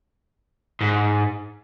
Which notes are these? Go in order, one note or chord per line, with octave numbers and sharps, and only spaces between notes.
G#2